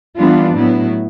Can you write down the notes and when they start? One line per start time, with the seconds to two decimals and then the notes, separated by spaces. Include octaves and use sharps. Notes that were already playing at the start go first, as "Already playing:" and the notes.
0.16 E3 G3 B3 D4 F4
0.56 A2 F#3 B3 E4